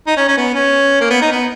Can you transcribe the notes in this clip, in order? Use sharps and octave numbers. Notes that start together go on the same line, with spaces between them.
D#4
C#4
C#4
B3
C#4
A#3
B3
D#4
B3